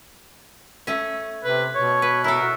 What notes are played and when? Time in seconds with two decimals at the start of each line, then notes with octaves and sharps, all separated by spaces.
0.87 A3 C#4
1.44 C3 B4
1.75 B2 C#5
2.02 B4
2.24 E4 A4 A#4
2.41 F#4